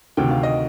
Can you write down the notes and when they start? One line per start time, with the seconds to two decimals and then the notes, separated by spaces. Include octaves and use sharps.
0.17 D2 C3 D#3 G5
0.31 F5
0.43 D#5